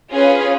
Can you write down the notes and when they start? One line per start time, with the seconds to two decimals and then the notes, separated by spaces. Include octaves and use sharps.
0.12 C#4 F4 G#4 B4